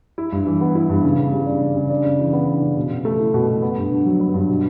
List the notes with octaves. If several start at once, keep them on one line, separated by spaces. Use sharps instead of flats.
E4
G2
E3
B3
E4
G2
C#3
C#3
G3
D4
C#3
C#3
D4
C#3
E3
B3
D4
C#3
B2
B2
A3
E4
B2
B2
B3
G2
D3
F#3
B3
G2
B2